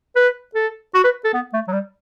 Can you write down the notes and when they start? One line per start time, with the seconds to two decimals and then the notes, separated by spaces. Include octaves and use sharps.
0.16 B4
0.55 A4
0.94 F#4
1.04 B4
1.24 A4
1.34 B3
1.54 A3
1.68 F#3
1.73 G3